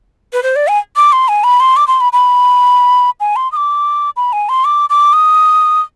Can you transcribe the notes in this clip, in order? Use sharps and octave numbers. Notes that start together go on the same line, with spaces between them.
B4
C5
D5
G#5
D6
C6
G#5
B5
C6
D6
C6
B5
B5
G#5
C6
D#6
D6
B5
G#5
C6
D6
D6
D#6